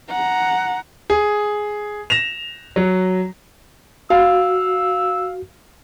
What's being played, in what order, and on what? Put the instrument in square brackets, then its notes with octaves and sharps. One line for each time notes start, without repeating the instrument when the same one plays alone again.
[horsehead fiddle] F#5 A#5
[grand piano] G#4
A#6 E7 F7
F#3
[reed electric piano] F#4 [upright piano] F5 [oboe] E6